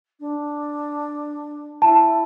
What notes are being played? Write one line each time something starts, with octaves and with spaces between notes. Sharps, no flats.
D4
E4 A5